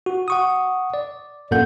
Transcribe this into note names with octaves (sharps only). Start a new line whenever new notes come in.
F#4
F#5 C#6 D#6
D5
F#2 A#2 A#3 A4 F#5 G6